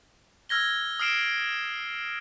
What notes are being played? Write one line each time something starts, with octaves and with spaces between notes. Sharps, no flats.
E6 F6 G#6 A#6 G7
D#6 F6 C7 D7 E7